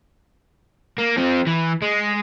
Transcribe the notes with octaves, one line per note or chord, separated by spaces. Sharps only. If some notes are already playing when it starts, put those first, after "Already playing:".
A#3
F3 C4
E3
G#3